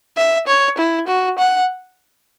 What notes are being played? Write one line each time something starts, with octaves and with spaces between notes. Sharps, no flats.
E5
C#5
E4
F#4
F#5